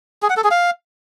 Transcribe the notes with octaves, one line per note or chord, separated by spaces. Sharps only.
G#4
F#5
A4
G#4
F5